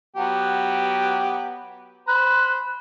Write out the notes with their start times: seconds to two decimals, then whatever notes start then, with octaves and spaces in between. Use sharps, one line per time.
0.16 F#3 B3 G4
2.08 C5 B5 F#6